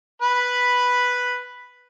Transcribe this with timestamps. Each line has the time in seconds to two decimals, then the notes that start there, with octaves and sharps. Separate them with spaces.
0.22 B4 B5